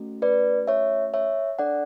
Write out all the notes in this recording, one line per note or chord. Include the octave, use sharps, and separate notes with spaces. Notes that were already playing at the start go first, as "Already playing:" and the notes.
Already playing: A3 C#4 F#4
B4 D5
C#5 E5
C#5 E5
D4 A4 D5 F#5